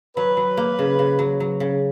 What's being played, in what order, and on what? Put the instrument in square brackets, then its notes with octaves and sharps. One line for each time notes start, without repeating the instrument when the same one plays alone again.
[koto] F#3 [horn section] B4
[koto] F#3
A#3
C#3
C#3
F#3
F#3
C#3